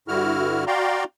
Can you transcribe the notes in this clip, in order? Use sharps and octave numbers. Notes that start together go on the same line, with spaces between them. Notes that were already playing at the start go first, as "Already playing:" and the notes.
G2 D3 E4 F#4 F6
F#4 D5 F5 G5 A#5 C6